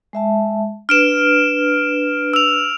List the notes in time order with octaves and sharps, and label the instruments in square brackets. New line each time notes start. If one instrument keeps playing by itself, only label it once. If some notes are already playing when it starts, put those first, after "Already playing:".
[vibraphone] G#3 E5 A5
[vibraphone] D4 B4 [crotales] F6 D7 E7
[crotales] E6 F7